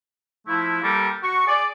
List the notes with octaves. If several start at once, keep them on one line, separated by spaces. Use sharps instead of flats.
F3 A3 E4
G3 A#3 G4 A4 A#4
F#4 C#6
G#4 D5